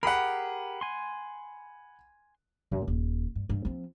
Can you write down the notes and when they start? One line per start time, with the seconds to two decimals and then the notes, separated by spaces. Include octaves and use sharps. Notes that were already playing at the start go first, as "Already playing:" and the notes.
0.03 G4 G#4 A#4 F#5 B5
0.81 G#5 C6
2.72 F#2
2.88 D#1
3.35 G2
3.49 G2
3.65 F3 C4